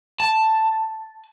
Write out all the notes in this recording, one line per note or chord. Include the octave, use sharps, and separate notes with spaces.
A5